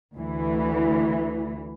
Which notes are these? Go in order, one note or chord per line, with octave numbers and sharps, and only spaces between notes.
D2 E3